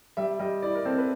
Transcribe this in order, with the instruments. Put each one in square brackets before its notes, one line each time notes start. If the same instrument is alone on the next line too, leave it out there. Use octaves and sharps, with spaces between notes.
[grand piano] G3 [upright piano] E5
[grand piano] G3 [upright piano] D#5
[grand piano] E4 [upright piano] D5
[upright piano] A#4
[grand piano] C4 [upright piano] A4
[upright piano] B4